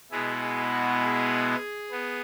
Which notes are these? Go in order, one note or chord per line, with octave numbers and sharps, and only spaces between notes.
B2 G#3 B3 E4 G#4
G#4
F#4
G#4
B3